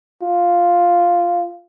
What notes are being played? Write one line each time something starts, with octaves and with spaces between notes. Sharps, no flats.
F4